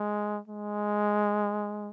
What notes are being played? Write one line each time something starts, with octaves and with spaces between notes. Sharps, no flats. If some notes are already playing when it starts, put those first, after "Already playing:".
Already playing: G#3
G#3